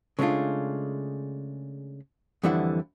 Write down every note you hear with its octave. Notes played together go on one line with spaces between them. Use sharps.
C#3 G#3 A3 B3 D4 F4
F2 D3 E3 G3 E4 F#5